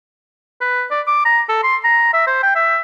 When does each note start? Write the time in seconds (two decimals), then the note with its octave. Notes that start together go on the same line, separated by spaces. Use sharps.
0.61 B4
0.91 D5
1.07 D6
1.25 A#5
1.49 A4
1.64 C6
1.84 A#5
2.13 E5
2.27 C5
2.43 G5
2.56 E5